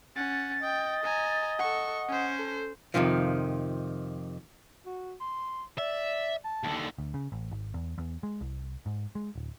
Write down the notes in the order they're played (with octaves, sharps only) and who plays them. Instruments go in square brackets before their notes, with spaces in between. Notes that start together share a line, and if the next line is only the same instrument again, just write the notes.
[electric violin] C#4 F#5 [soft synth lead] A6
[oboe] D#5 [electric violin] G5
[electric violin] G#5 A#5
[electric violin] A4 C#6 [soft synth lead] F#5
[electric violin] C#4 C5
[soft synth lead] A4
[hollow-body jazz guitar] F2 G#2 C3 D#3 F3
[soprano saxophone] F#4
C6
[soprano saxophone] D5 [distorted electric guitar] E5
[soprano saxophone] A5
[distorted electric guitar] D#2 D3
[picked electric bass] D2
C#3
A1
G#1
E2
E2
G#3
C2
G#2
G#3
D1